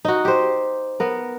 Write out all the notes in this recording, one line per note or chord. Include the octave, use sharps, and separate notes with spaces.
D#4 F#4
G4 C5
B3 A#4